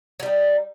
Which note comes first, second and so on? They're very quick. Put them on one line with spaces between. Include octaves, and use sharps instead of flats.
F#3 G3 D#4